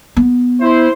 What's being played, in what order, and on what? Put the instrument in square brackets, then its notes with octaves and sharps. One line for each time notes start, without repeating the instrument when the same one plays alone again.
[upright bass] B3
[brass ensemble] E4 C5